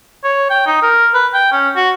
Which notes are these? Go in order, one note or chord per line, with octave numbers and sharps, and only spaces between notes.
C#5
G5
D#4
A#4
B4
G5
C#4
F#4